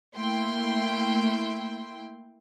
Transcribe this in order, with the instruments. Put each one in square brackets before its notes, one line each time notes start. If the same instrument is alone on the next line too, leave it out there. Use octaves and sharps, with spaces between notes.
[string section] A3 A#3 E4 G5 C6